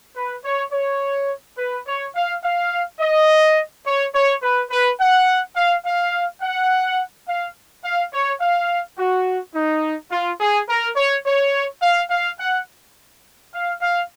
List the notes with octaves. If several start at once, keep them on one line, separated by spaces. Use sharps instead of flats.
B4
C#5
C#5
B4
C#5
F5
F5
D#5
C#5
C#5
B4
B4
F#5
F5
F5
F#5
F5
F5
C#5
F5
F#4
D#4
F4
G#4
A#4
C#5
C#5
F5
F5
F#5
F5
F5